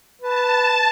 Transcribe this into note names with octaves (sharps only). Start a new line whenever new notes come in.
B4 A5